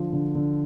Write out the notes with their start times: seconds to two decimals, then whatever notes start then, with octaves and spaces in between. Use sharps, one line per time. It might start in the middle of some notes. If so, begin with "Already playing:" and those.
Already playing: D3 F3
0.13 D3
0.35 D3